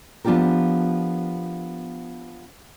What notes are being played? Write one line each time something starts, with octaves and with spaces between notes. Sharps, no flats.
F3 B3 D4 F4 G4 A#4